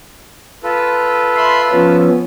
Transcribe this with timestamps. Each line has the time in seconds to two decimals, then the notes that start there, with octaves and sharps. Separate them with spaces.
0.63 F4 A4 B4
1.36 E5 B5 C6
1.71 F3 B3 C#4